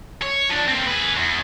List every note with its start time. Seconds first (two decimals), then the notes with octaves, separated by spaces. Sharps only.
0.22 C#5
0.49 F3 D4
0.68 A#3 C4
0.87 G#4 B4
1.17 E2